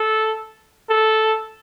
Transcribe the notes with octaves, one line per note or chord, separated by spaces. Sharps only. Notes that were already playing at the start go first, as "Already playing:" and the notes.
Already playing: A4
A4